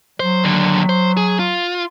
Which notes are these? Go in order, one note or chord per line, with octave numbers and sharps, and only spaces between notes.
F#3 C5
D#2 D3
C5
G#4
F4